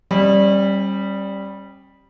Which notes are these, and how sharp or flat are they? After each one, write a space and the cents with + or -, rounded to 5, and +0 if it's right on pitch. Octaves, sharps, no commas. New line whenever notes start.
G3 +0 C#4 -45 D#5 +0